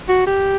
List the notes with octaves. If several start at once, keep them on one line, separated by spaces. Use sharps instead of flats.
F#4
G4